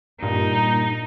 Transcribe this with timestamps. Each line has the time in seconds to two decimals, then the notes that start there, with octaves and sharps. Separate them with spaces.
0.22 G2 A#2 D#4